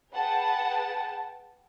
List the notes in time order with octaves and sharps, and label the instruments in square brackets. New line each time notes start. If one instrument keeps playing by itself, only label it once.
[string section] G#4 B4 F#5 G5 A5